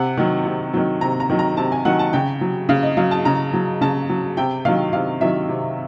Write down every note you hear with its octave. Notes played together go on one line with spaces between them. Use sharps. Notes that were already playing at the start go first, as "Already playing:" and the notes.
Already playing: C3 F#5
D#3 F#3
C3
D#3 F#3
C3 A#5
A#5
D#3 F#3
A#5
C3 A5
G#5
D#3 F#3 F#5
A5
C#3 G5
F#3
C#3 F5
D#5
F#3 F5
A5
C#3 A#5
F#3
C#3 A5
F#3
C3 G5
D#3 F#3 F5
C3 F5
D#3 F#3 E5
C3